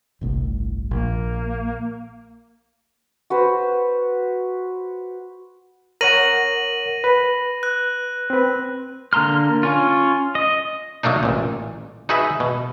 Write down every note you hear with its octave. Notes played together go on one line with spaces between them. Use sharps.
G1 C2 A2
A#1 A#3
F#4 B4 C5
A#4 C#5 F#5 A#6 D#7 F#7
B4
F#6
C4 B4
D3 A#3 A#5 C6 F6
C#4 F4
D#5
F#3 A3 A#3 D4 D#4
A1 A#2
D#4 F#4 G#4 B4 E5
B2